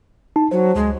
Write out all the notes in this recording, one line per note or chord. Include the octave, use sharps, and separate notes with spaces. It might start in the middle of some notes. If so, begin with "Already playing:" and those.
D#4 A5
F#3 C5
C#2 G#3